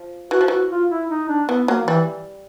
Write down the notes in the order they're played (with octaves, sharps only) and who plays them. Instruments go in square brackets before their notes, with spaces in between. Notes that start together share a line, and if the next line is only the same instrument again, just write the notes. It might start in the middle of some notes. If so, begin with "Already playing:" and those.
Already playing: [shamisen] F3
[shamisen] E3 [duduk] F#4
[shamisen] F3
[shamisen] E3 [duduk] F#4
[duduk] F4
E4
D#4
D4
[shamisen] E3 [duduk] B3
[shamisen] F#3 [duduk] A#3
[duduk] E3 [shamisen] G3